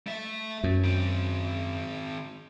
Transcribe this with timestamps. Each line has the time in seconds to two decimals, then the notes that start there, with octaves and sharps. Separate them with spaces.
0.07 A3 E5
0.64 F#2
0.84 D#3 C4